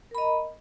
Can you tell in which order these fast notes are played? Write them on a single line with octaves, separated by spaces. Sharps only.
A#4 B5 D#5 A#5